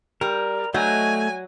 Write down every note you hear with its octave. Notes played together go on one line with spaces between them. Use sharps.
G3 A#4
F#3 A3 D#5 G#5 G6